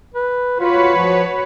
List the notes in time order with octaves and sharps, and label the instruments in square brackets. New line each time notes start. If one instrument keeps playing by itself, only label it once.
[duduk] B4
[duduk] F4 [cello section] F#4 B4 C#5
[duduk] F3